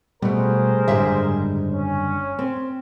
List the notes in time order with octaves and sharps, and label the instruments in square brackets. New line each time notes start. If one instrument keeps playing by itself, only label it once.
[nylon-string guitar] B2 [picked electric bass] G3 A3 [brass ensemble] G#4 A#4 C5
[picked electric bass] F#1 D3 G3 [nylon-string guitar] G#2 B2 E5
[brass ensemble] C#4
[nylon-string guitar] C4